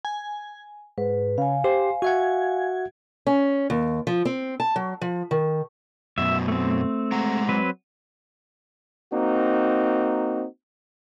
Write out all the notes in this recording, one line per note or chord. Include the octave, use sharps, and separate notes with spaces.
G#5
G#2 B4
C#3 F5 G#5
G4 C5
F#4 E5 F#5 G#6
C#4
D#2
F3
C4
A5
F#3
F3
D#3
F#2 B2 E5
A3 C4
G#3 F#5 A#5
F#3 C4 B4
A#3 C4 D#4 F#4